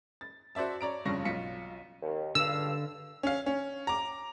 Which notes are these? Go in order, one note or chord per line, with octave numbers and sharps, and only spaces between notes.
A6
F#4 C5 D5 E5 A5
C#5 D5 A#5 D7
F1 G2 C#3 F4 C#6 A#6
B1 F4 B6 C#7
D#2
C#2 G2 D3 F5 E6
C#4 F5
C#4
A#5 D6